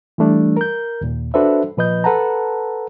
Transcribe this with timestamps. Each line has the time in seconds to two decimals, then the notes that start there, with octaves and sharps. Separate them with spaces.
0.18 E3 G3 A3 D4
0.57 A#4 G6
1.01 D#2 A#2
1.34 D4 F#4 A4 B4 C5 E5
1.77 A#2 F3 B4 D#5 G6
2.04 A4 B4 F#5 A5 A#5